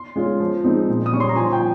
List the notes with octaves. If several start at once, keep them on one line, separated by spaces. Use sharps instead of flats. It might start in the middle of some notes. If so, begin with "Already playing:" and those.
Already playing: C6
G#3 C#4 F4
F3
G#3 C4 D#4
A#2
D#6
G3 C#4 C#6
C6
A#5
F3 G#5
G5